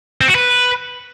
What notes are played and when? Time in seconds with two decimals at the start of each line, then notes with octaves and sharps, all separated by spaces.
0.21 C4
0.28 F#4
0.35 B4